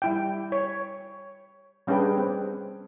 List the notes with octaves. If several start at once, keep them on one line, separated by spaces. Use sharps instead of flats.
G3 E4 G5
C#5
G3 C#4 D4 G#4 B4 G5
C4